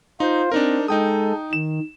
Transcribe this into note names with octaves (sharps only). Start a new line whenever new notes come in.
D#4 F4 C5
C4 D4 D#4 A#4
G#3 D#4 A4 G5 D#6
D#3 E7